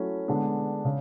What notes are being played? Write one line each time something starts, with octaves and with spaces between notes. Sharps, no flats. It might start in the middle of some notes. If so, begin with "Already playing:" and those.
Already playing: F#3 A3 C#4 E4
D3 G#3 B3 D4
C#3